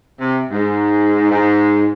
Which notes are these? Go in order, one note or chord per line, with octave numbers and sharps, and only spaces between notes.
C3
G#2
G#2